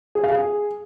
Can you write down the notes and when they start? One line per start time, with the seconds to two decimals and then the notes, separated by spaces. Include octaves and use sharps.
0.15 G#4
0.23 F5
0.32 G#4